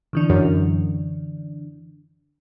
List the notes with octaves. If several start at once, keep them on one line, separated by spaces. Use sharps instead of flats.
D3 E3 D4
F#2